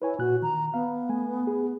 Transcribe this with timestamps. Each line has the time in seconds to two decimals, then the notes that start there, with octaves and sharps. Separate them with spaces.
0.02 E4 B4 C#5 G#5
0.19 A#2 F#4 F#6
0.42 D#3 A#5
0.74 B3 F5
1.09 A3 G#5
1.47 G#4